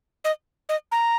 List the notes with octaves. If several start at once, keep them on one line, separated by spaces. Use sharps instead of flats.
D#5
D#5
A#5